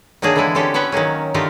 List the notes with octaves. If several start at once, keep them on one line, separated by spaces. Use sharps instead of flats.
D#3 F#3 A#3 D4 G#4
D3 E3 G#3 B3 E4
D3 C4 C#4 G4 A4
B3 C#4 B4 E5 G5
D#3 F#3 A#3 C#4
D3 D#3 A3 F4 G4 A#4